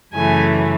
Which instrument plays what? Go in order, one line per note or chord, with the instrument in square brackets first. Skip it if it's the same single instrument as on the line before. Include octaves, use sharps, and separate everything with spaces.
[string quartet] F#2 C#3 E3 A3 G#5